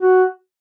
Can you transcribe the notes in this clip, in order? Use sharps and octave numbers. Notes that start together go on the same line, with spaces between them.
F#4